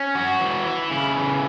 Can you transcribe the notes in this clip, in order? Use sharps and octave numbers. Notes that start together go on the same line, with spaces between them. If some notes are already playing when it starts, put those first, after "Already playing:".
Already playing: C#4
F#4
E3
E4
C#3
E3